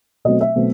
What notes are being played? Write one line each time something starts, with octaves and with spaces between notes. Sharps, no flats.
B2 F#3 A3 C4 D#5
E5
B2 F#3 A3 C4